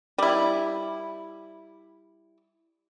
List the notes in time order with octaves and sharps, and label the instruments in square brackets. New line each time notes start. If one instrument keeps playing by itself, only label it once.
[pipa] G3 E4